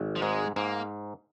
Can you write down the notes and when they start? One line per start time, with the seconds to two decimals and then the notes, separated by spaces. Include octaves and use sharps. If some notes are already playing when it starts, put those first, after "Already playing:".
Already playing: G#1
0.16 F3
0.22 G#2 G#3
0.56 G#2 A#3